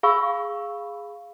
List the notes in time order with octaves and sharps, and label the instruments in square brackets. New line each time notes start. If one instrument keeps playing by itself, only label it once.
[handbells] G#4 F5 B5 C#6 E6